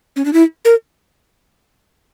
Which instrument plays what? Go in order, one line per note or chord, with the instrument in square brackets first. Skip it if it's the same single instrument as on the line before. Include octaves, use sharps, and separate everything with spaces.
[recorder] C#4
D4
E4
A#4